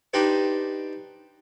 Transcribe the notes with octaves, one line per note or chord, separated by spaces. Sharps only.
D4 D#4 G4 B4 C5 D#5